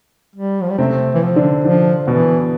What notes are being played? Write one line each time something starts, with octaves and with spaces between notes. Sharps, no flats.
G3
F3
G3
C3 A3 C4
E3
F3
D3 D4
D3 F3 D4
B2 E3 B3